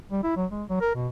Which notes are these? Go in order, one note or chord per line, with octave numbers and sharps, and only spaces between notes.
G3
E4
F#3
G#3
F#3
A#4
B2